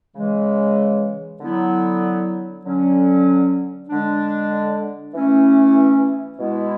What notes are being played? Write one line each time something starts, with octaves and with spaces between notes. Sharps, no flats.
C#3 E3 G#3
D3 F#3 B3 E4
D3 F#3 C#4
D3 G#3 D4
E3 A3 C#4 E4
B2 G#3 B3 E4